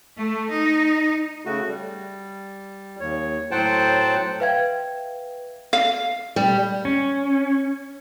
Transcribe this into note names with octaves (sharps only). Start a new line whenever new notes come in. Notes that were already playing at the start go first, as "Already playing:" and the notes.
A3
D#4
C#3 A3 F#4
G3
D#2 C#5
A2 F#3 C5 F#5 G5 A5
B4 E5 F5 G5 G#6
F5
G3
C#4